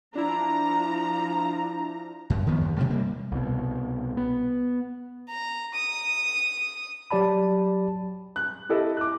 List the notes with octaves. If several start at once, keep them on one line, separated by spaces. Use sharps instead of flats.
F3 D4 E4 A#5
F#2
D#3 F3 B3
D#2
B2 D3 G3 A3
C3 G3 A#3
C2 B2
B3
A#5
D#6
F#3 G4 D5 A5 B5
F#6
E4 G4 A4 D#5 E5
D6 F#6